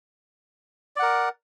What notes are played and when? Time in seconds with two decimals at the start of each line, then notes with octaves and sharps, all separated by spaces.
0.96 D5
0.99 F#5
1.03 A#4